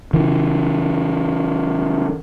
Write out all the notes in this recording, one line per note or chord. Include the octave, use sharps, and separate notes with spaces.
C#3 E3